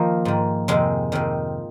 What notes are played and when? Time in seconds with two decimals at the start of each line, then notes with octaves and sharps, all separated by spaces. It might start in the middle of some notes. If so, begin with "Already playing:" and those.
Already playing: D#3 F3 A#3
0.25 G#2 D#3
0.68 F2 C3 D#3 G#3
1.12 F2 C3 D#3